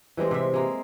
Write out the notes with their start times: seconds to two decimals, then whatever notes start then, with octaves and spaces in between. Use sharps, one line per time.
0.17 E3 G3 G#3 C4
0.31 C3 E5
0.54 G#3 A#3